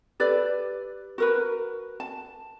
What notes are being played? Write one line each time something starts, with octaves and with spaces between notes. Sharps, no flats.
G4 A4 B4 D5
F#4 A#4 B4
A5